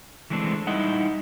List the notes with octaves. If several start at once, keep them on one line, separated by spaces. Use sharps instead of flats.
E3 G#3 A3 C4 D4
G3 D#4 E4 D#5 F#5